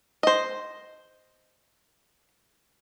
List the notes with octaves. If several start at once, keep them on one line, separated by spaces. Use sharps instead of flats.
C5 D#5